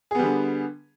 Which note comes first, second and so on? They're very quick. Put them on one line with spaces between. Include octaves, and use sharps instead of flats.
G#4 B3 G3 D3